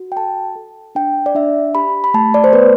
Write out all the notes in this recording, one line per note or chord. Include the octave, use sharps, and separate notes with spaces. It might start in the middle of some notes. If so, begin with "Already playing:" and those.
Already playing: F#4
G5
A4 A5
A4
D4 G5
D5
D4 E5
G4 B5
B5
A3 A5
D5
C5
B3 B4